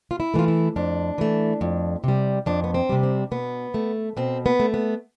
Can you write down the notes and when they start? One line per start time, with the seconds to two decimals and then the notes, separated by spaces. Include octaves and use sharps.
0.11 F4
0.20 E4
0.34 E3 A3 F4
0.48 E4
0.76 F2 D4
1.18 E3 A3
1.61 F2
2.04 C3 G3
2.46 F2 D4
2.64 B3
2.74 C4
2.89 C3 G3
3.03 C4
3.31 B2 B3
3.74 A3
4.17 B2 C4
4.46 B3
4.60 A3
4.74 B3